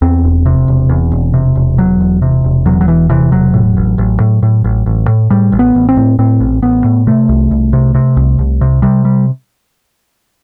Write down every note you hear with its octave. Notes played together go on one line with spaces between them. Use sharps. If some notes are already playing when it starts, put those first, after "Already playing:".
E2 C4
E1
C3
E1
E2
E1
C3
E1
E2 F#3
E1
C3
E1
E2 F#3
F#3
E1 E3
C3 E3
E1 F#3
A2
A1
A1
A2
A2
A1
A1
A2
A2 G3
A1
B3
A1
C4
A2
A2 C4
A1
A1 B3
A2
C3 A3
C2
C2
C3
C3
C2
C2
C3
C3 G3
G3